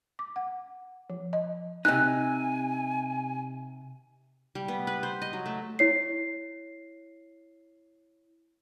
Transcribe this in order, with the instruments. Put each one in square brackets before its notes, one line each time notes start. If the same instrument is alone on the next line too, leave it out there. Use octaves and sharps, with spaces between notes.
[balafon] D6
F#5
F3
D#5
[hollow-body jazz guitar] C3 D#4 [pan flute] G#5 [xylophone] F#6
[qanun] G3
B3
B4
C5
D#5
F#3
A3
[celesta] E4 C#5 C7